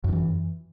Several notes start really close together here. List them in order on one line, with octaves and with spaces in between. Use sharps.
F#2 D#3 E3